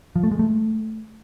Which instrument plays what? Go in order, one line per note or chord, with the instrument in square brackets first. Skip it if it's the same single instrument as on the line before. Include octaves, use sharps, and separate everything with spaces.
[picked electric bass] F3
A3
G#3
A3